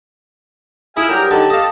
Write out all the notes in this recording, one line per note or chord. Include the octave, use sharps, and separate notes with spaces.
E4 G#4 F5 G#5
G2 F#3 G4 A#4 G5
D3 F#3 D#4 A5
A4 D#5 F5